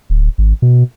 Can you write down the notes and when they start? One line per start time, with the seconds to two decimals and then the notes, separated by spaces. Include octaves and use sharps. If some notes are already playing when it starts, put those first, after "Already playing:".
0.10 D1
0.38 G#1
0.62 B2